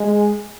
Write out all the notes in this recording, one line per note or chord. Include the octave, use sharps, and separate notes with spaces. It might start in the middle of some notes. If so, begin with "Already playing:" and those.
Already playing: G#3